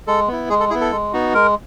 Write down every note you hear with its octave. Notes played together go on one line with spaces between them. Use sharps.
G#3 A4
B3 E4
G#3 G#4
A4
B3 E4 G#4
A4
G#3
B3 D#4 F#4
G#3 A#4